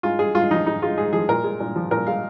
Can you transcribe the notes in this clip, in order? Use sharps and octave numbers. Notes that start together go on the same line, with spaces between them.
G#2 F4
G#3 G#4
G#2 F4
F3 D#4
G#2 D#4
G#3 F4
G#2 G#4
F3 G#4
A#2 A#4
G#3
A#2
F3
A#2 A#4
G#3 F5